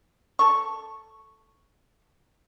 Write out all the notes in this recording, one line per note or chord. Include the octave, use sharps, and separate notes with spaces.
A4 C#6